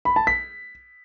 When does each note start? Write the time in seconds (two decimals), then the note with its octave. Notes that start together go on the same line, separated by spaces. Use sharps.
0.05 B5
0.16 A5
0.27 B6